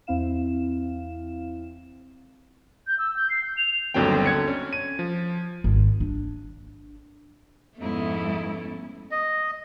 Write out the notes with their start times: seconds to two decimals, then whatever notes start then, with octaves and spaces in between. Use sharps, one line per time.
0.07 E2 C4 E4 F5 E7
2.87 G6
2.98 E6
3.16 G6
3.30 C7
3.43 G6
3.57 F7
3.94 G1 D#2 D3 F#3 C4 G5
4.26 D3 G#6 C#7
4.48 C#4
4.73 D#7
4.99 F3
5.64 G#1
6.00 D4
7.79 F2 G#2 A3 B3 C#4 E4
9.11 D#5